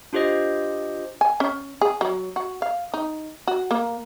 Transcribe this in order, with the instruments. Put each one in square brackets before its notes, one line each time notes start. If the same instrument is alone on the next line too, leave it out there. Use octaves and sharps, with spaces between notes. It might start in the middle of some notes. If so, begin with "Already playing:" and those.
[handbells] D4 F4 G4 C5 D#5
[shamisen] G#5
C#4
G#4
F#3
F#4
F5
D#4
F#4
A#3